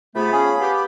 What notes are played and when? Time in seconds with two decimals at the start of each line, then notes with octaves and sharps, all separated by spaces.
0.15 C3 A3 B3 F4 G#4 B5
0.33 C#4 G#4 F5 G#5 A5
0.61 B3 G4